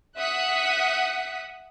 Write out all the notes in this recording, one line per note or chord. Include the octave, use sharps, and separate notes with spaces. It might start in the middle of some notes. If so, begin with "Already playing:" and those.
E5 F#5 D#6 F#6 B6